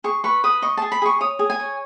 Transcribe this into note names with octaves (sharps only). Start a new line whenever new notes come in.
G#4 C#6
B4 C#6
B4 D#6
D#5 C#6
G#4 A5
B5
G#4 C#6
C#5 D#6
G#4
G#5
C#5